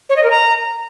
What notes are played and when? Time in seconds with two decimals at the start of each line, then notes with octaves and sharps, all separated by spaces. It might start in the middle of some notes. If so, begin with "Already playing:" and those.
0.09 C#5
0.16 D#5
0.24 A#4
0.31 A#5